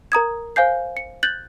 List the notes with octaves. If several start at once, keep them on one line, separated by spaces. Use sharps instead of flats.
A#4 A#5 D#6 G#6
C5 F5 G#5 G6 C7
C#7
F#6 G6 A6 F#7